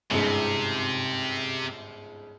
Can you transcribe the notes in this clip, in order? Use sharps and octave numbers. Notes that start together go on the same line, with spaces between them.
G1 C#2 G#2 C3